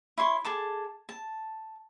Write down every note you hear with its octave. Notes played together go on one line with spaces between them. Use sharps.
E4 C#5 C6 C#6
G#4 A4 A5 D6
A5